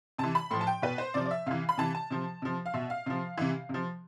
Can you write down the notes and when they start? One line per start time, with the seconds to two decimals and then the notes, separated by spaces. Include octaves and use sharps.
0.18 C3 E3 A5
0.35 B5
0.51 A2 F3 C6
0.61 A5
0.67 G5
0.82 B2 B4
0.98 C5
1.14 C3 F3 D5
1.26 D5
1.31 E5
1.46 C3 E3 F5
1.69 B5
1.78 C3 E3 A5
1.95 A5
2.10 C3 F3
2.42 C3 F3
2.66 F5
2.74 B2 E5
2.90 F5
3.06 C3 F3
3.37 C3 E3
3.69 C3 F3